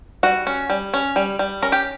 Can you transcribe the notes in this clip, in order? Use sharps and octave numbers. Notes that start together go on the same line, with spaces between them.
G3 F#4
C#4
G3
C#4
G3
G3
C#4 A#4
G4